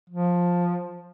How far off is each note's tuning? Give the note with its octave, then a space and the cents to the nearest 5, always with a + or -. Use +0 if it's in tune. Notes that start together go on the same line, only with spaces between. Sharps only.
F3 +10